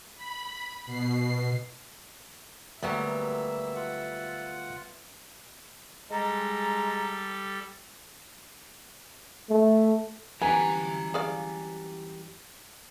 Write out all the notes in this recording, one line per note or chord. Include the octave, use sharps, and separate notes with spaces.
B5
B2 C7
D2 F#3 G3 A#3 B3 E5
F4 F#5
G3 G#3 A4 A#5
A3
F#2 E3 G3 B3 G4 G#5 A#5
G#4 D5 F5